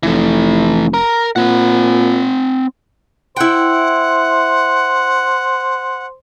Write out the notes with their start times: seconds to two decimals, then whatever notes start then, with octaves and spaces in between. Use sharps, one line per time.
0.03 F1 E3 A3
0.94 A#4
1.36 A#2 C4 F#5
3.37 E4 C5 F#5 G5